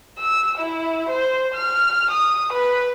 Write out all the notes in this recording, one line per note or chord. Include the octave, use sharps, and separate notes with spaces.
E6
E4
C5
F6
D#6
B4